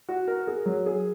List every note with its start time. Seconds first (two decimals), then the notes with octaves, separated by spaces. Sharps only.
0.09 F#4
0.28 A#4
0.47 G#4
0.66 F#3
0.86 G#4